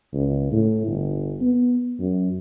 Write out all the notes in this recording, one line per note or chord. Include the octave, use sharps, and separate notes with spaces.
C#2
A2
G1
B3
F#2